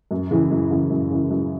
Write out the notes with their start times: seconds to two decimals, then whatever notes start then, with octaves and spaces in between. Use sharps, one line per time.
0.11 F#2
0.31 C#3 E3 G#3
0.51 F#2
0.70 C#3 E3 G#3
0.90 F#2
1.10 C#3 E3 G#3
1.30 F#2